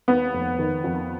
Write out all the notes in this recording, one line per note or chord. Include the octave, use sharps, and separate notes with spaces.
D#2 B3
F1
D#3
F2